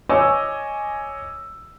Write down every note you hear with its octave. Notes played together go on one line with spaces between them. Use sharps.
C#5 D#5 G#5 C#6 D6 E6